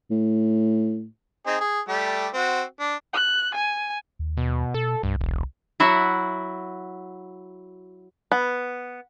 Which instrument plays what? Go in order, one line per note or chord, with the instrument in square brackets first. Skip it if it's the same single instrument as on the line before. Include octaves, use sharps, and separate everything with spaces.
[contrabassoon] A2
[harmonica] C4 D#4 G#4
G#4
G3 A3 G4
C4 F#4
D4
[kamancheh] F#6
G#5
[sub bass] D#2
[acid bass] B2
[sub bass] B2 [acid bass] A4
[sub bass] C2 [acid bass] G2
[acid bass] E1
[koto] F#3 E4 F#4 E5 F#5
[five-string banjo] B3